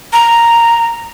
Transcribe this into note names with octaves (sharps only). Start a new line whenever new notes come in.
A#5